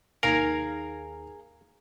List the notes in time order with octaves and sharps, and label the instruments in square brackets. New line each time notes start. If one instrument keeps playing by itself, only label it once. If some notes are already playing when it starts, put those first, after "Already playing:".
[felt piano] D#2 D#3 C7 [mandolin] G#4 F5 A#5 [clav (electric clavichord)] A#4